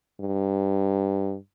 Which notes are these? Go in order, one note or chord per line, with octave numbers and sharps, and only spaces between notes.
G2